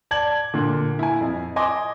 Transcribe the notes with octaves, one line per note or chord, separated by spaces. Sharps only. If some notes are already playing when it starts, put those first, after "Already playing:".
D5 A5 G#6 F#7
A#2 D3
E4 G#5
F2
D#5 G#5 C6 D6